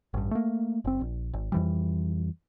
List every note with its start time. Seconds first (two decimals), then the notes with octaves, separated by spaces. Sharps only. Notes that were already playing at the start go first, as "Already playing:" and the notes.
0.14 A1 G2
0.31 A3 A#3
0.84 F#1 C4
1.01 A#1
1.33 G#1
1.52 F2 E3 G3